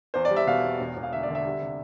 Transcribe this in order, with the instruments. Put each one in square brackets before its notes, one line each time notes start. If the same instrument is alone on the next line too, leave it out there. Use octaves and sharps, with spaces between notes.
[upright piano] E2 C5
D5
G3
E5
B2 F5
E2
E1
E1
F5
D2 E5
D5
D3
E5
G3
C3